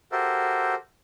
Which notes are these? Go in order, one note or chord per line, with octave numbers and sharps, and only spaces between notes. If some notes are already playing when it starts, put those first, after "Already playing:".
F#4 G4 A4 A#4 C5 E5